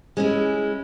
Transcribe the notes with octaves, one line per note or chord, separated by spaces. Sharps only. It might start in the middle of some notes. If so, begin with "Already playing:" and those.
G#3 C#4 E4